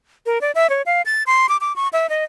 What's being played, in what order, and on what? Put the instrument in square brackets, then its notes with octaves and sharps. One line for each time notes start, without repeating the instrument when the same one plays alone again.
[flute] A#4
D5
E5
C#5
F5
A6
C6
D6
D6
C#6
E5
D#5